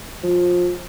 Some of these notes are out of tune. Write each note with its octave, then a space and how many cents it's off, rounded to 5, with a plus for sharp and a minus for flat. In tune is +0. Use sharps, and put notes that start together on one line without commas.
F3 +20